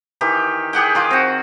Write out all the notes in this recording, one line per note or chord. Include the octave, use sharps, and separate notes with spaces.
D#3 E3 G4
G4 G#4 F#5 G5
D#3 F4 D6
C4 F#4